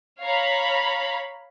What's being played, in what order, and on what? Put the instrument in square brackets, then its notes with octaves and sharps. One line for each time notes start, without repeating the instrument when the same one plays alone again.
[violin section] C#5 F5 A#5 B5